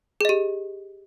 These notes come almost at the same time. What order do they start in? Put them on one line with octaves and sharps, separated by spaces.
G#4 D#5 G4